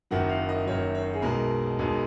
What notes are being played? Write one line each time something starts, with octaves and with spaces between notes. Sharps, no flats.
F#1 F#2 D#3 F#3 F#5
F5
D#5
F#1 F#2 D#3 F#3 C#5
C#5
G#4
B1 B2 G#3 A#4
B1 B2 G#3